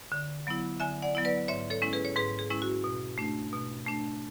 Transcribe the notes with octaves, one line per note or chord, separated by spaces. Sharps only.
D3
F#3 B3 E4
D3 E5 G#5
D5 F#5
F#3 B3 E4
B4 D5
G#2 C#5 E5
A4 C#5
G#3 C#4 E4
G#4 B4
C#5
G#2 G#4 B4
G#4
G#3 C#4 E4
F#4
B2
A3 D4
B2
A3 D4